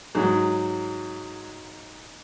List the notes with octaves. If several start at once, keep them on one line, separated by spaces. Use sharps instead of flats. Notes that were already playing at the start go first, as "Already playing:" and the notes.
G#2 F#3